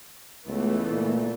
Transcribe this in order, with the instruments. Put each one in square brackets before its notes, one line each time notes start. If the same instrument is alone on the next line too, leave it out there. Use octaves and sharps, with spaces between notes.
[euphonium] C#2 [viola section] E3 A3 B3
[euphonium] A#2